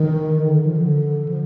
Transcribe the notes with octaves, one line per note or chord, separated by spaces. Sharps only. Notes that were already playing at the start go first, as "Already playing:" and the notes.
Already playing: D#3
D3
D#3
F3
D3
F3